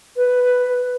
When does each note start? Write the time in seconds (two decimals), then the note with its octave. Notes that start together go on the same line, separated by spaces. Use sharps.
0.16 B4